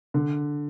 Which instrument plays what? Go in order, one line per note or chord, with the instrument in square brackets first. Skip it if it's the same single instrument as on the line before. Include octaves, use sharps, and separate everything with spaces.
[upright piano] D3